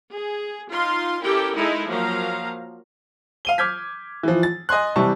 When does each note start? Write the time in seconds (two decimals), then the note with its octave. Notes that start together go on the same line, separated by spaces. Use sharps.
0.12 G#4
0.70 D#4 F4 F5 C6
1.22 C#4 E4 G4 A4 A#4 G5
1.56 G#3 D#4 E4 A4 D#5
1.87 F3 F#3 A#3 F5 A#5
3.45 F5 D#7 G7
3.58 D6 F6 G6 G#6 B6
4.23 E3 F3
4.43 A6
4.69 D#5 G#5 C6 F#6
4.96 C3 E3 G3 A5 C#6